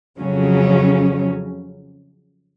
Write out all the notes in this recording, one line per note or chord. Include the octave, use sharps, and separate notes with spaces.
F2 C#3 F#3 C#4